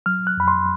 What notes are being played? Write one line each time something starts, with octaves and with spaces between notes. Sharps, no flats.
F#3 F6
F#6
F2 B5
C6